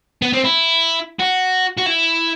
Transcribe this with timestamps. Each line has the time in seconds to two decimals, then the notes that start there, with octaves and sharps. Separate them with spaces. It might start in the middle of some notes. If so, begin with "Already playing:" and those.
0.22 B3
0.33 C4
0.45 E4
1.20 F#4
1.77 F#4
1.86 E4